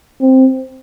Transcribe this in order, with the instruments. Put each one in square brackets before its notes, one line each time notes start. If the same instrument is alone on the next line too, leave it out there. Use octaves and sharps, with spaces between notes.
[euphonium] C4